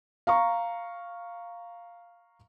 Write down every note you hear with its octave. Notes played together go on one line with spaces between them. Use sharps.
F5 A#5 C#6